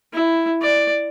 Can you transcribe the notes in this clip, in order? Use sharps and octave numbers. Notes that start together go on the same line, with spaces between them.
E4
D5